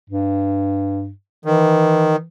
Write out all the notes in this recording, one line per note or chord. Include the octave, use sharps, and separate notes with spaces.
G2
D#3 E3